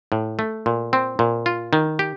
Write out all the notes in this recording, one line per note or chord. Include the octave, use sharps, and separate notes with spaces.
A2
A3
A#2
C4
A#2
F4
D#3
G4